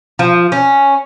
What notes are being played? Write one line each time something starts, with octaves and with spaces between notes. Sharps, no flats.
F3
C#4